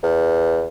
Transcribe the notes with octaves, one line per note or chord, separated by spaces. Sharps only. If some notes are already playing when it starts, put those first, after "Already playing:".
E2